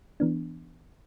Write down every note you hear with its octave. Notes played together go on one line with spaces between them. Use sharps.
E3 B3 D4